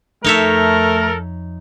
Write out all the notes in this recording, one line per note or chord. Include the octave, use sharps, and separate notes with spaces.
F2 A3 D#4 A4 A#4 C#5 E5